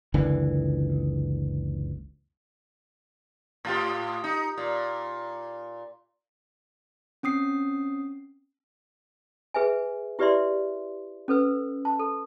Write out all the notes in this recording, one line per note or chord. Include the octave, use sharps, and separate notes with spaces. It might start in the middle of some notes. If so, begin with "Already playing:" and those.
F#1 C#2 D3 E3
A2 F4 G4
D#4
A#2
C4 C#4 D#6 C7
G#4 B4 E5 G#5
E4 G4 B4 D5 E5 C6
C#4 A4 B4 E6
A5
A4